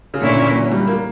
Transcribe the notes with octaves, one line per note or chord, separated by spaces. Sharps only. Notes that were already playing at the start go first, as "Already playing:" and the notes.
C#3
A#2 D3 A#3 C#4 E4
E3
F#3
G3
A#3